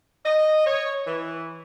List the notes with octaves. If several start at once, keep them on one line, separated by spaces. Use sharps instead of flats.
D#5
C#5
E3